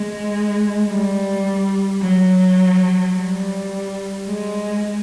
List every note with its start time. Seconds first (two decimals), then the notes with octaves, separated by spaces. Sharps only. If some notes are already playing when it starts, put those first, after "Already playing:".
Already playing: G#3
0.89 G3
2.02 F#3
3.16 G3
4.29 G#3